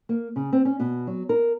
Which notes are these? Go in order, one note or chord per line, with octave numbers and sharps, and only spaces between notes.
A#3
C#3
C4
C#4
B2
F#3
A#4